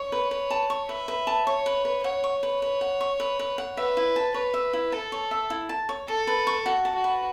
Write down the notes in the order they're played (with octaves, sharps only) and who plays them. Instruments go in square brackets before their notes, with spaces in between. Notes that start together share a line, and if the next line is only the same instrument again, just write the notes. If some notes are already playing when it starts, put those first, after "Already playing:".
Already playing: [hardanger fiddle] C#5 [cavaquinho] C#6
[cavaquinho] B4
B4
A5
C#6
[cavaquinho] B4 [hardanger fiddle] E5
[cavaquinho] B4
A5
[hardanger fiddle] C#5 [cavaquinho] C#6
[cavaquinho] B4
B4
[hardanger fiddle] C#5 [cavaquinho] F#5
[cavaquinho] C#6
B4
B4
F#5
C#6
B4
B4
F#5
[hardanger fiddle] B4 [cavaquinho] E5
[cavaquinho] E4
A5
[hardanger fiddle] B4 [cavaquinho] C#5
[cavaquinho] E5
E4
[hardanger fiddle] A4 [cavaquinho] A5
[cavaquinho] C#5
E5
E4
A5
C#5
[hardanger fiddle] A4 [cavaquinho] A5
[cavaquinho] B4
C#6
[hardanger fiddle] F#4 [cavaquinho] F#5
[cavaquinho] A5
[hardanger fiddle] F#4
[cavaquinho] B4